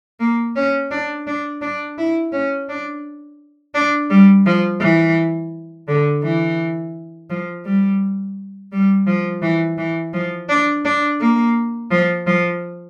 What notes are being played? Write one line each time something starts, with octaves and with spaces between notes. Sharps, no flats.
A#3
C#4
D4
D4
D4
E4
C#4
D4
D4
G3
F3
E3
D3
E3
F3
G3
G3
F3
E3
E3
F3
D4
D4
A#3
F3
F3